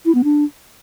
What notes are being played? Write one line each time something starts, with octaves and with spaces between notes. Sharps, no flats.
E4
B3
D4